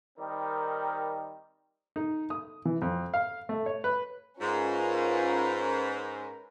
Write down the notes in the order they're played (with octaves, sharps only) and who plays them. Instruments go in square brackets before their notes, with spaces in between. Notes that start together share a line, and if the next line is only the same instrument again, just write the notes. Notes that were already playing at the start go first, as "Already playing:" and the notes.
[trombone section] D#3 G3 C4 D#4 A#4
[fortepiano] D#4
D#6
E3
F2
F5
A3
C#5
B4
[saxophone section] G#2 [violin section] C#4 A#4 B4 [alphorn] F4